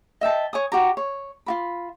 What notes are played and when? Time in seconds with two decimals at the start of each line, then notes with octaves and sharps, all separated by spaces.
0.21 D#5 E5 G5 A5
0.53 C#5 G#5 D#6
0.72 F#4 G4 A#5
0.97 C#5
1.46 F4 F#4 B5